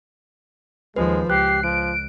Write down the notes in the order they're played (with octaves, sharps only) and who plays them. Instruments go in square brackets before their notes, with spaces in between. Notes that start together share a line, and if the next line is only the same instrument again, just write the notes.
[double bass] D#2 F3 [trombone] G#3 [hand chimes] B4
[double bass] C#2 [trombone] G4 [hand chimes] F#6 [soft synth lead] C7
[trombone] F3 [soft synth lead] D7